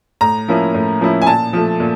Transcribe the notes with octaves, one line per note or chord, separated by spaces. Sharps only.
A2 A#5
F3 A#3 C#4 E4
A2
F3 A#3 C#4 E4
G#5
A#2 A5
F3 A3
A#2